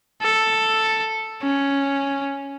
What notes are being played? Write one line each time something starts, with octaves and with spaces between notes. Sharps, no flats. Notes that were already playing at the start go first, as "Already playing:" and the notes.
A4
C#4